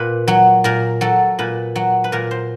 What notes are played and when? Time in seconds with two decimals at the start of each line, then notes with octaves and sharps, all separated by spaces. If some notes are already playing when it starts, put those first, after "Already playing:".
Already playing: A#2 B4
0.28 F#3
0.64 A#2 A#4
1.01 F#3 A4
1.39 A#2 B4
1.76 F#3
2.04 B4
2.12 A#2 A#4
2.31 C5